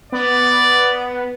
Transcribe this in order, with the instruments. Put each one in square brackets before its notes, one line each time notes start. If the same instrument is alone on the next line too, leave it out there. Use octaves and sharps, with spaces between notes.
[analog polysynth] B3 [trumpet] D5